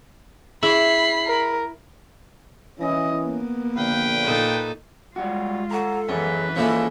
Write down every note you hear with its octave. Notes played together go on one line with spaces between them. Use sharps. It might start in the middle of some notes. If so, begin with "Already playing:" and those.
E4 G#4 E5 B5 C7 F#7
A#4
E3 C#4 E4 D#5
A#3 B3
A#1 D3 B4 F5 G5
A#2 D#4 A4
G3 G#3 F4 F#4
A4 F#5 A#5
F#2 E3 C#4 G#4 A#4 B4
F3 A#3 C#4 E4 F4 G#4 A4